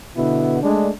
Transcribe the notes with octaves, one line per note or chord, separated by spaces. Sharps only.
B2 D3 B3 E4
G#3 A3 D4